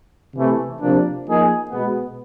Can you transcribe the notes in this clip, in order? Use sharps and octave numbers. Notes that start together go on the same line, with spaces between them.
C3 E3 A3
C3 F3 A#3 D4
F3 A#3 D#4 G#4
B2 G#3 B3